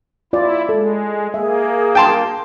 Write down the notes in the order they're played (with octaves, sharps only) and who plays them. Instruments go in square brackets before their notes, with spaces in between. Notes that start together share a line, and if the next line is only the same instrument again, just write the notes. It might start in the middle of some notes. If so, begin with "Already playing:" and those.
[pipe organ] E4 [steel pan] F4 D5
[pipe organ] G#3 [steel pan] A4
[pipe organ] A#3 [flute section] G#4 [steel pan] E5
[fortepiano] G5 A5 C6